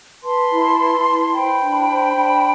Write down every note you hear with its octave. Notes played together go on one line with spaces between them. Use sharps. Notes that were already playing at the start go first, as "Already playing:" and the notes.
B4 A5 C6
E4
B4
E4
C5 G5 B5
D4
C5
D4